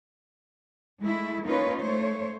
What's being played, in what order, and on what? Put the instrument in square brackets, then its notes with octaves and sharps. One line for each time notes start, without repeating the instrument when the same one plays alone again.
[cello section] G#3 A3 E4
A#3 C#4 D#4 F4 B4 C#5
A3 C5 C#5